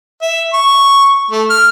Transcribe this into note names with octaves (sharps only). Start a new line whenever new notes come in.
E5
C#6
A3
F6